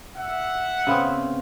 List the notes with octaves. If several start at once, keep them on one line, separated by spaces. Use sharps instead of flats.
E5 F#5
C#3 B3 C4